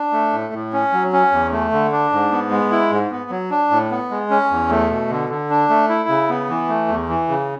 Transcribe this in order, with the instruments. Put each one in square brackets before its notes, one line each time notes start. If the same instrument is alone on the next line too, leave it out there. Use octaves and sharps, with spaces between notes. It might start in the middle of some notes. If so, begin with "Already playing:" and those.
Already playing: [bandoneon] D4
A3
A2
A2
C#4
F#3
C#4
E2
A3
D3
D4
G#2
B3
G#3
E4
G#2
B3
F#3
D4
A2
B3
G#3
C#4
E2
A3
B2
D3
D3
D4
A3
E4
C#3
B3
E3
A3
E2
E3
C#3